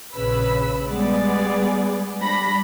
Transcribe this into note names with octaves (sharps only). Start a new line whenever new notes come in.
A#1 C#3 B4 B5 E6
G3 G#3 B3 G#4 D5
G3 D4 B5 A#6